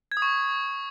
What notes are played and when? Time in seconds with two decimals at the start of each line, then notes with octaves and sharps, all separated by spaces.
0.12 G#6
0.17 D#6
0.22 C#6